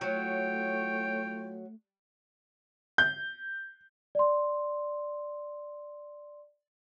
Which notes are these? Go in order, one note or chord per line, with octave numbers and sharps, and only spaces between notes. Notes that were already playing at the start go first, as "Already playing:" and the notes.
F#3 A3 E4 F4 C#5 G5
G6
D5 C6